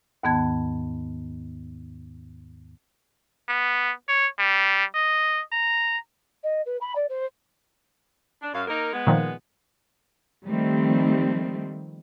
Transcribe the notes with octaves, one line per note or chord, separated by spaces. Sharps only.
D#2 G#2 D#3 B3 A5 G#6
B3
C#5
G3
D#5
A#5
D#5
B4
B5
D5
C5
D4
F#2 F5
A#3 D#4 A#4
G#3 B3
A#2 D#3 F3
D#3 F3 G3 A3 C4